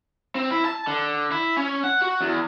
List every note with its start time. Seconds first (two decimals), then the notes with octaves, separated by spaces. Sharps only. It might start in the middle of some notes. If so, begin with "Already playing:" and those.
0.35 C4
0.51 E4
0.65 A5
0.87 D3
1.32 E4
1.57 C#4
1.84 F#5
2.02 F#4
2.21 E2